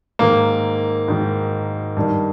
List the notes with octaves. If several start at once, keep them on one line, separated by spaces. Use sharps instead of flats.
G#2 D#3 A#3
G#2 D#3
G2 D#3